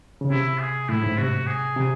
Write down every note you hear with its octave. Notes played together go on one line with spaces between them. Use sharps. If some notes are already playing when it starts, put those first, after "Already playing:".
C#3
C3 E4
G#4
A2 E4
G#2
C3 F#4
G#4
C3